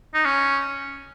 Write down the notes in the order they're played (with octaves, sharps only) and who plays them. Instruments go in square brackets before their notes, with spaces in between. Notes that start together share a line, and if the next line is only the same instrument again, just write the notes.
[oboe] D#4
C#4